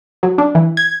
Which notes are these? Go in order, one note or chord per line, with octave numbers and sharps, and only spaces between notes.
F#3
D4
E3
G#6